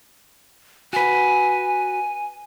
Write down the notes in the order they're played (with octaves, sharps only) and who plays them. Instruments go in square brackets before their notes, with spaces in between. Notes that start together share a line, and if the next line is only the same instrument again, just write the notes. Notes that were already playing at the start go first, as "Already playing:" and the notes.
[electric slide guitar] F#4 B4 [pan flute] G#5